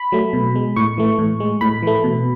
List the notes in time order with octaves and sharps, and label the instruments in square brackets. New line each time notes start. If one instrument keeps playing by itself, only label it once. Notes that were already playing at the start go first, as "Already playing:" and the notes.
Already playing: [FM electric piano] B5
F#3 A3
B2
G#3
A2 C#6
E3 A3
A2
G#3
A2 B5
E3 A3
B2